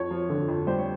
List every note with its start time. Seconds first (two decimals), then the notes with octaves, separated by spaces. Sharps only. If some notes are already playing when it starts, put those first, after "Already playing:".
Already playing: F2 C#5
0.10 F3
0.30 D3
0.48 F2
0.67 G3 C5
0.78 C#5